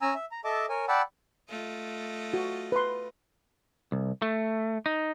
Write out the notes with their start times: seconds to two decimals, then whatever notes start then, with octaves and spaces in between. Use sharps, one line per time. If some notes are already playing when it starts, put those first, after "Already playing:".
0.01 C#4 G#5 A#5 E6
0.15 E5
0.31 A#5
0.44 A4 D#5 E5 A5 D6
0.69 A#4 C#5 G#5
0.88 D5 F#5 G5 A5 B5 E6
1.49 A3 F4 D#5
2.34 F#4
2.72 B4 C6
3.92 C2
4.22 A3
4.86 D#4